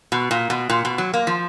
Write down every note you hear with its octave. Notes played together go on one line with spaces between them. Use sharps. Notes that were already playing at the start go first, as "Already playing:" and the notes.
B2
A#2
B2
A#2
B2
F#3
A#3
F3